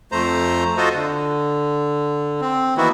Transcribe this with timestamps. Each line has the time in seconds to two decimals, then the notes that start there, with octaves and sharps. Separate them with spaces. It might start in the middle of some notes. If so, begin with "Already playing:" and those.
0.12 F2 A3 C5 A#5
0.77 F4 F#4 A4 C5 D#5
0.94 D3
2.41 C4
2.77 D#3 E3 A#3 B3 E4 F#4